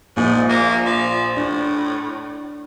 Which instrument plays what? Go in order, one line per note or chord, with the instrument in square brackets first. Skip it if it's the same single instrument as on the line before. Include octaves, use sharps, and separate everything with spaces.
[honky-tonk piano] A#1 [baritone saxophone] G#2
[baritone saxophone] A#3
F3
[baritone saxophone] A2 [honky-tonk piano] D4